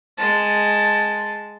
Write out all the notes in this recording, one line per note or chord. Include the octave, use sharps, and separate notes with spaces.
G#3 A5